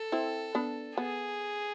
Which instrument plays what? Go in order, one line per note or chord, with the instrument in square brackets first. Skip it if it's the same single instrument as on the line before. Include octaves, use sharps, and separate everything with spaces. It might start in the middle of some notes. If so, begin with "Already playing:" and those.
Already playing: [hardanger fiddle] A4
[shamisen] C4 E4
B3 D4
[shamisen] B3 [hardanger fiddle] G#4